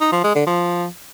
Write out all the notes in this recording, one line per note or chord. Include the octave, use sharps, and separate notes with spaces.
D#4
F3
G#3
D3
F3